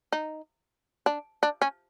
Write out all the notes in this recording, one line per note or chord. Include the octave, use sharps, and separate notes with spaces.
D#4
D4
D4
C#4